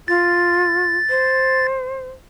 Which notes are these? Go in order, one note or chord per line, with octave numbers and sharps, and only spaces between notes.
F4 A6
C5